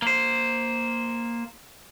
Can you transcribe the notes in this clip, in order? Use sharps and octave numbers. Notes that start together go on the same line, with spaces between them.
A#3 C5